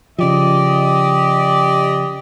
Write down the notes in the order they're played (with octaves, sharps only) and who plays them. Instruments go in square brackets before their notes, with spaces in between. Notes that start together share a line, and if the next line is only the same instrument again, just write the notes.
[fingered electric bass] C#3 F3 [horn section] G4 D5 D#5